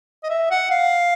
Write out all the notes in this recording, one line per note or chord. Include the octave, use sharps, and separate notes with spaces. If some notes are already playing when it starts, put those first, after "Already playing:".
D#5
E5
F#5
F5